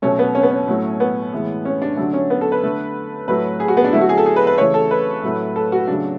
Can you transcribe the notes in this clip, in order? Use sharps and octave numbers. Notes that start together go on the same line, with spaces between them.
B2 F#3 A3 C#4
B3
C#4
B3
C#4
A2 F#3 A3
B3
A2 E3 G#3
C#4
D4
D3 F#3 A3 D4
C#4
B3
A4
B4
D3 A3
A2 F#3 A3 B4
G#4
F#4
B3
D4
D3 F#3 A3 E4
F#4
G#4
A4
G#4
B4
B4
C#3 E3 A3 C#5
A4
B4
A2 F#3 A3
A4
F#4
C#3 F#3 A3 D4